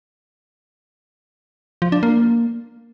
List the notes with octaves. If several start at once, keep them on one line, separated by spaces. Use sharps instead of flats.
F3
D4
A#3